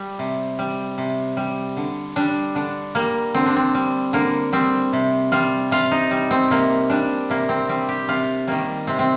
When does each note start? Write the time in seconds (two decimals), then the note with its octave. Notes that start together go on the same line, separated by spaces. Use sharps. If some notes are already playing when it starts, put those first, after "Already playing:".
Already playing: G3
0.19 C3
0.59 G3
0.98 C3
1.37 G3
1.77 D3
2.16 G3 D4
2.55 D3 D4
2.95 G3 A#3
3.34 D3 C4
3.46 D4
3.57 C4
3.74 G3
4.13 D3 A#3
4.53 G3 C4
4.93 C3
5.32 G3 F4
5.71 C3 F4
5.92 D#4
6.11 G3
6.31 C4
6.50 C3 A#3
6.90 G3 D4
7.30 C3 A#3
7.49 C4
7.69 G3 C4
7.89 G4
8.08 C3 F4
8.47 D#3 G3 A#3
8.87 C3 C4
8.99 C4